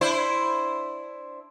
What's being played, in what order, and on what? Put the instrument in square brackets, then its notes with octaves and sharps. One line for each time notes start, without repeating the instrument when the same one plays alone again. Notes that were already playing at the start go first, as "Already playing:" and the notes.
[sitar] D4 E4 C5